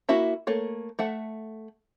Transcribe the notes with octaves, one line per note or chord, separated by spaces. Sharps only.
A#3 E4 F#4 E5 A#5
A3 A#3 C#5
A3 E5 F#5